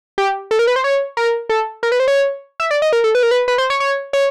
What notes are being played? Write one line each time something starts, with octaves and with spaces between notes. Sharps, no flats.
G4
A4
A#4
B4
C5
C#5
A#4
A4
A#4
B4
C5
C#5
E5
D5
D#5
A#4
A4
B4
A#4
B4
B4
C5
C#5
C#5
C#5